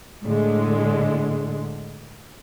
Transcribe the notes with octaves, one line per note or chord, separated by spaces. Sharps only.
A2 D3 G#3